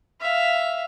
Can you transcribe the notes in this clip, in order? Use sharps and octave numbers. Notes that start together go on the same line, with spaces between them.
E5 F5